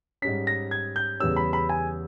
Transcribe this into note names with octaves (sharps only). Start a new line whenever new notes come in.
G#2 G3 C#4 B6
A#6
G#6
G6
E2 C#3 G3 C#4 E6
B5
B5
G#5